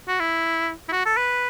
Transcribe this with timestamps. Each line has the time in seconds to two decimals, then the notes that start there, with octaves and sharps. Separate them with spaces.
0.08 F#4
0.20 E4
0.89 E4
0.92 F#4
1.05 A4
1.17 B4